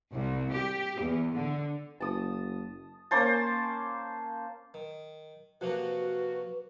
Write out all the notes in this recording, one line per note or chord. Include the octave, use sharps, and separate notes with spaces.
C2
G4
E2
D3
F#1 A5 D#6
A#3 C#4 C5 A5
D#3
C3 F3 A#3 F#4 B4